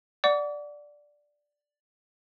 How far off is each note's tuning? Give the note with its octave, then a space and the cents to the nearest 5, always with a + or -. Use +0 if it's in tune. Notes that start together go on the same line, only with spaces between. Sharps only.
D5 +0 F#5 -5 D6 -40